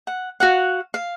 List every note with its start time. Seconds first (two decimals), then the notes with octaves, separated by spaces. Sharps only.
0.07 F#5
0.40 F#4 F5 F#5
0.94 F5